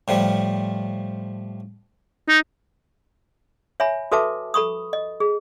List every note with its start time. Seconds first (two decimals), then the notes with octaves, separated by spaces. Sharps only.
0.08 A2 F3 G3
2.28 D#4
3.80 C#5 E5 G#5 B5
4.12 F#4 A4 B4 E5 A5 D6
4.54 A4 B5 C#6 D#6
4.93 D#5
5.20 G#4